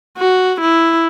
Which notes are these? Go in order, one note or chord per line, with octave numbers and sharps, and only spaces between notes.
F#4
E4